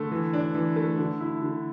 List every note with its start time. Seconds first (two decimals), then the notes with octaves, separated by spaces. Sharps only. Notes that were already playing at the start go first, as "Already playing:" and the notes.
Already playing: D3 A3
0.11 E3
0.33 D4
0.55 E3
0.76 A3
0.98 D3
1.20 E4
1.41 D3